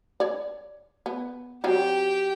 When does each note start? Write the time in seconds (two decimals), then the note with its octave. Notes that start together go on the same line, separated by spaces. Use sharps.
0.20 C#5 D5
1.06 B3
1.64 F#3 C4 F#4 G4 G5